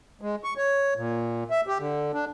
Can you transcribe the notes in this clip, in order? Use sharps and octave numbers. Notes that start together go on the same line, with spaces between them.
G#3
C#6
C#5
A#2
E5
G4
D3
D4